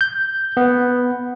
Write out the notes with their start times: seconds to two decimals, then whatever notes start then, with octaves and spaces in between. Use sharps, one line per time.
0.01 G6
0.57 B3